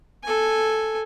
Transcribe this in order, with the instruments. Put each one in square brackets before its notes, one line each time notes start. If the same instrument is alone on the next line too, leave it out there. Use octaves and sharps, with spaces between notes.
[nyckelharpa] A4 G#5